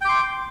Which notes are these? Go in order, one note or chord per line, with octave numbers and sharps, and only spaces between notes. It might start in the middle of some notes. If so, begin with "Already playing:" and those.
G5 C6 D6